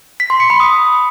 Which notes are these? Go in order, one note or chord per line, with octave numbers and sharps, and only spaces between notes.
B6
C6
C#7
B5
D#6